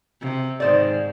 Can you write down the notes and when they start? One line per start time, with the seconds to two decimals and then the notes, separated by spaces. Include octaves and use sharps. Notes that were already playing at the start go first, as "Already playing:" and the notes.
0.21 C3
0.60 G#2 D#3 C5 D5